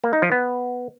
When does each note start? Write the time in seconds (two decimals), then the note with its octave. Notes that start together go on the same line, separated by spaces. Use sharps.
0.04 A#3
0.13 D#4
0.22 F3
0.32 B3